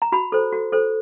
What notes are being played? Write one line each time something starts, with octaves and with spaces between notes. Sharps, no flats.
A#5
F#4 B5
A4 C5
F#4
A4 C5